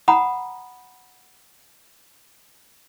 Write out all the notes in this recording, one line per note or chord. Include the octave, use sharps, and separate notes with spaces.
F#5 A#5 B5 D#6